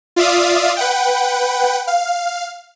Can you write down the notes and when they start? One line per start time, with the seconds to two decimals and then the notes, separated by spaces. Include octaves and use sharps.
0.16 F4 D5 E5 F5 D#6
0.76 B4 F#5 G5
1.87 F5